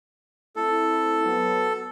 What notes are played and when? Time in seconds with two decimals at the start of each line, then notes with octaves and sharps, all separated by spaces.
0.56 A3 C4 E4 A4
1.24 F#3 B3